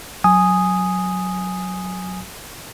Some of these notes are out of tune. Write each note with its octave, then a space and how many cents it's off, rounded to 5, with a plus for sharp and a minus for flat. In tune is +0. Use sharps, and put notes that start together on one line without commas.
F#3 -5 G#5 +0 D#6 +0